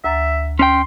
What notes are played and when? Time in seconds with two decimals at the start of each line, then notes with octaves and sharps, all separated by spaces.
0.04 D2 E5 A#5 A6
0.59 C#4 D4 G5 C6